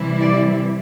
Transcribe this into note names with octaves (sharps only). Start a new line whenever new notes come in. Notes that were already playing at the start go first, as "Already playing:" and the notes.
Already playing: C3 E3 G3 E4
D5